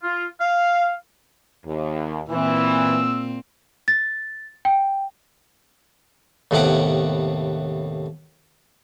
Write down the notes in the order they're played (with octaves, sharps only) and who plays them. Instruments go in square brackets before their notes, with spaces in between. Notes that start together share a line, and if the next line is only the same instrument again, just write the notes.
[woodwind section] F4
F5
[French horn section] D#2
[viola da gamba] A#2 C4 [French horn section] E3 [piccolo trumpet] E6
[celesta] A6
G5
[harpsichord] D#2 A2 C3 B3 F#5 D6